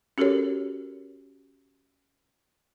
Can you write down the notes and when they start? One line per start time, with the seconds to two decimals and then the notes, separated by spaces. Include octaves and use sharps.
0.18 C#4 F#4 G4 A4 A#4 C#5